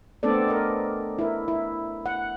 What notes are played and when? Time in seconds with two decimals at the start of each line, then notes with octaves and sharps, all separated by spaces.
0.23 A3 B3 C4 D4 A4 D5
0.48 A#4 D#5
1.19 E4 A#4
1.48 E4
2.06 F#5